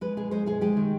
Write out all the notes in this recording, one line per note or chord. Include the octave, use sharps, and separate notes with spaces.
G#3 B4
B2 G#4
G#3 C5
G#3 G#4
G#3 G4
D#3